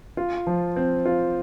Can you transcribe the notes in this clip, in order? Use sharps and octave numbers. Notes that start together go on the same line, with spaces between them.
F4
F3
C4
F4